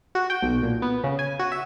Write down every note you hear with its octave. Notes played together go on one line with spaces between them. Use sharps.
F#4
G5
B1
A#2
B3
C#3
G#5
F#4
E5